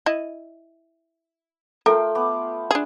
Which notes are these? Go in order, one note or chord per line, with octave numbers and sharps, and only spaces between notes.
E4 D#5
A3 F4 A4 A#4 G5
B3 D6
D4 G#4